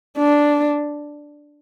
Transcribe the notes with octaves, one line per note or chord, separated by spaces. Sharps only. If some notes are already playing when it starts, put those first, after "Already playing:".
D4